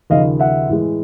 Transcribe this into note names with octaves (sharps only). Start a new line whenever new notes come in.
D#2 C#3 F3 D#5 F5
E5 F#5
A2 E3 G#3